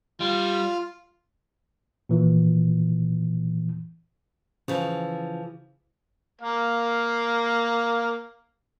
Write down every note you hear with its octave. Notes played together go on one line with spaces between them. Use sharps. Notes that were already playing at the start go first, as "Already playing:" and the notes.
G3 F4
A#2 E3
C#3 E3 F3
A#3 F5